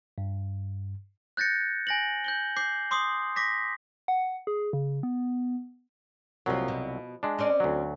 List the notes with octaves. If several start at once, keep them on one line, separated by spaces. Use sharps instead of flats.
G2
F#6 G6 A6 A#6 C#7
G#5 A#6 F#7
G6 F#7 G7
D6 G6 C7
C6 D6 D#6 C7
D6 A#6 B6
F#5
G#4
C#3
B3
C2 F3 F#3 A#3
B2
G#3 D4
C4 C#4 D5
D2 F#3